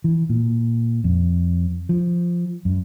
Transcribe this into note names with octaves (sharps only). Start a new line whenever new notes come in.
E3
A#2
F2
F3
F#2